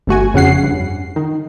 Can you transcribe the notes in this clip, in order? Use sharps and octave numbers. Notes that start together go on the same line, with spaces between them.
G1 A3 F#4 G#5
F2 C#3 C#4 F#5 C7
G2
D#3